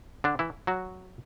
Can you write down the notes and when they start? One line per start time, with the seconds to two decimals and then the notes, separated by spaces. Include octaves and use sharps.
0.24 D3 D4
0.39 E3 E4
0.67 F#3 F#4